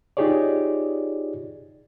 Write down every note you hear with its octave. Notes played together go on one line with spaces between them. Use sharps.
D#4 F4 G4 G#4 C#5 D5